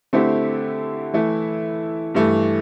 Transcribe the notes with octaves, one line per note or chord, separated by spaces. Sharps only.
D3 A3 C4 E4 G4
E3 A3 E4
G2 E3 A3